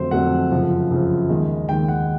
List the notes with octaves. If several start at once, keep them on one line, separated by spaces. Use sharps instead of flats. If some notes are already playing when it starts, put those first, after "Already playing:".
Already playing: F2 D3 F#3 A3 C5
F2 D3 F#3 A3 F#5
F#2 C#3 F3
F#2 C#3 F3
D#2 D#3 G#3
D#2 D#3 G#3 G5
F#5